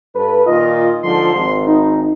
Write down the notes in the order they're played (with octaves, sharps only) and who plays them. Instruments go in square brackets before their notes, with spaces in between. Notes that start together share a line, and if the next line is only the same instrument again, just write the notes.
[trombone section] G2 A4 B4
[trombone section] A#2 D#3 F4 [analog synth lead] D#5
[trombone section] G#2 D3 F3 [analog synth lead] C6
[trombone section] G#1
[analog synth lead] D#4